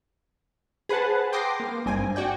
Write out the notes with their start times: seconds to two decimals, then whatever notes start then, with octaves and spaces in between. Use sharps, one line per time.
0.89 G#4 B4 C5 F#5 A5
1.32 G5 C6 D6 D#6 A#6 C7
1.60 A#3
1.85 G#1 G2 C4 G#5
2.16 F#4 D5 G5